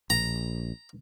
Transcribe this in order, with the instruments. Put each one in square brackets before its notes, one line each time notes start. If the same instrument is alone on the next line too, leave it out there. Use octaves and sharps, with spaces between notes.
[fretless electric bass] A#1 [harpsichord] A#5